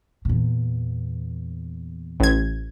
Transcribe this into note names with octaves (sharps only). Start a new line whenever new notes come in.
E2 A#2
A1 G#6